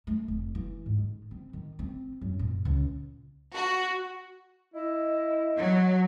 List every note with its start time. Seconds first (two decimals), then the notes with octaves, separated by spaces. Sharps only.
0.07 A3
0.28 F1
0.55 E3
0.86 G#2
0.98 D#3
1.31 C4
1.53 D#3
1.79 C4
2.21 F#2
2.39 A#2
2.65 C#2
3.53 F#4
4.74 E4 D#5
5.58 F#3